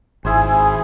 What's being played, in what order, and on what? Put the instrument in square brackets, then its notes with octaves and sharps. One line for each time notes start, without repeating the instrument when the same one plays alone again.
[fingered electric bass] G#1 [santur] E4 G#4 C5 [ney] G#5